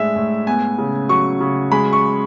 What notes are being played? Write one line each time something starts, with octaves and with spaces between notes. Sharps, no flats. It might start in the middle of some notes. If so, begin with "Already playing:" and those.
Already playing: A2 G#3 D4 E5
A2
B3 G#5
C#3
F#3 C#6
C#3
G#3 B5
C#6